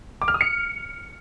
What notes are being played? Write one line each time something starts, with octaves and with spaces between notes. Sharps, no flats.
D6
F6
D#6
C#7